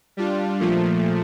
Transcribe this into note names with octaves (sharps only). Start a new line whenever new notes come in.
G3 D4 F4
A#2 F3 A3